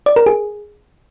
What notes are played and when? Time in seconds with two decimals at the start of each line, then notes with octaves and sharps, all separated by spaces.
0.06 D5
0.16 A#4
0.26 G#4